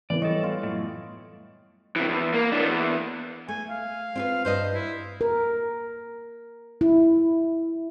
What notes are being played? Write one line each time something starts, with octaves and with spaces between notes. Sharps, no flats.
E3 B3 D5
G3 A4 C#5 D#5
F4
F#2 A2
C3 E3
E2
A#3
E3 D4
E2
A3 G#5
F5
C4 F4 B4
G2 B4 C5 D#5
E4
A#4
E4